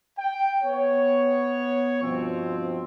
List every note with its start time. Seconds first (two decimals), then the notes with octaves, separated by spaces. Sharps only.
0.19 G5
0.63 B3 C#5
2.03 G2 B2 F3 C4